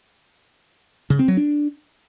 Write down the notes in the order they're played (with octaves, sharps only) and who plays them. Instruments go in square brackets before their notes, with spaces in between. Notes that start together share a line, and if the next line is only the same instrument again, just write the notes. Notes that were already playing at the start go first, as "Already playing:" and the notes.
[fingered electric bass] C#3
C4
F#3
D4